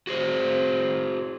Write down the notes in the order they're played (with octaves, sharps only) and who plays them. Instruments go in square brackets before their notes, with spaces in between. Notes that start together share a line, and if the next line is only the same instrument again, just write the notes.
[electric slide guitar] F#4 G#4 C5